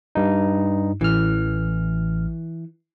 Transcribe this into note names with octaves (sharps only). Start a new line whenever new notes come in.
G2 D#4
A1 E3 F6